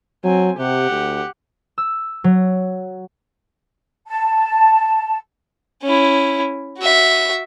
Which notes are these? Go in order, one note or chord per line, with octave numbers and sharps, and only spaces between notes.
F#3 C4 G#5
C3 G4 F#5
D2
E6
F#3
A5
C#4 E4
F#4 E5